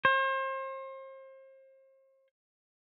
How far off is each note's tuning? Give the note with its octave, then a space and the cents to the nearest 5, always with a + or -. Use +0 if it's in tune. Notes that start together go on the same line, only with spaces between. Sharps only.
C5 +35